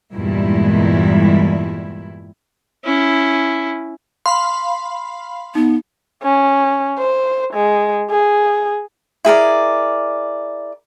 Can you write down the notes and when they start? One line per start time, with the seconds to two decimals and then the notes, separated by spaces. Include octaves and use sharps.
0.13 E2 G2 A#2 G3 G#3 E4
2.84 C#4 E4
4.26 F5 B5 C6
5.55 B3 D#4
6.23 C#4
6.98 C5
7.53 G#3
8.10 G#4
9.25 E4 G#4 A#4 D5